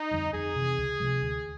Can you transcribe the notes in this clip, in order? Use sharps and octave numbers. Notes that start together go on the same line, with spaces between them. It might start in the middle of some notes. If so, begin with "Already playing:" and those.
Already playing: D#4
F2 D3 G3
F2 G#4
C3 E3
C#2
C3 F3 G#3
D2